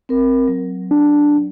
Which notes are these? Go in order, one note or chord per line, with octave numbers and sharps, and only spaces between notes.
C4 A#4
F#3
D4